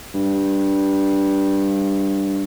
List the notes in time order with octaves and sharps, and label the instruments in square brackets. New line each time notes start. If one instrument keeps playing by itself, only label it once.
[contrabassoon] G2